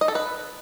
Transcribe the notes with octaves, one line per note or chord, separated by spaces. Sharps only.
D#5
A4
B4